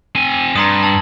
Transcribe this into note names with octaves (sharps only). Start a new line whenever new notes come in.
C4 G#5
G2 A#5 C6 D#6
A5 E6 F#7